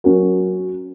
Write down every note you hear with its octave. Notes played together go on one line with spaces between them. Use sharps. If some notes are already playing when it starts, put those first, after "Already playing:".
F#3 C#4 F#4 A#4